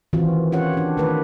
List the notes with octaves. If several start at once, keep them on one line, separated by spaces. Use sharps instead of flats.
D#3 E3 C4 F4 F#4
C#4 F4 G4 C#5 F#5
D4 G4
D#3 A3 F4 A#4 B4